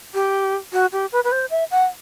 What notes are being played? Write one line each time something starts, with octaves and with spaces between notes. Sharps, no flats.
G4
F#4
G4
B4
B4
C5
E5
F#5